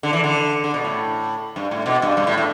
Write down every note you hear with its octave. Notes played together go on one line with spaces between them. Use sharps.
D3
E3
D3
D3
B2
A2
G2
A2
B2
G2
G2
A2
A2